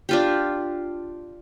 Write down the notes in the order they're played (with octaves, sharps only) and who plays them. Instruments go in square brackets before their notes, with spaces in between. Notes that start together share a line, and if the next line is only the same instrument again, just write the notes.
[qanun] D4 F4 G4